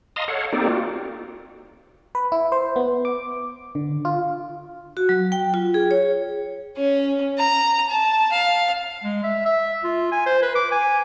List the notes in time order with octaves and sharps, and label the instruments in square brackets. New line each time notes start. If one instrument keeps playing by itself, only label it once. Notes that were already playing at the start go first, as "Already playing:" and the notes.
[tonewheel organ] D#5 F5 A5 A#5 C6 D#6
A4 C#5 F5 F#5
A#3 C4 D#4 G4 A4 D5
F4 F#4
[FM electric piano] B4
E4
C5
B3
D6
D3
F4
[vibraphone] F#4
F#3
G5
F4
G#4
C#5
[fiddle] C#4
A#5
A5
F5
[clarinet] G#3
E5
E5
F4
G#5
C5
B4
D6
G#5